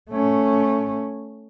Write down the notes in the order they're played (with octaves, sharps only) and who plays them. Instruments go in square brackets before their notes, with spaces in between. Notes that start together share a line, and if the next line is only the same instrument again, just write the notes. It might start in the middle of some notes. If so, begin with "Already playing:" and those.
[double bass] A3 C#4